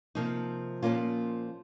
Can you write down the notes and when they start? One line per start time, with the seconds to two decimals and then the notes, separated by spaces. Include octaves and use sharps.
0.15 C3 F3 A#3 D#4
0.83 A#2 F3 A#3 C#4 F4